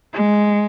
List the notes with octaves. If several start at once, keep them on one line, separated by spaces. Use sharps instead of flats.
G#3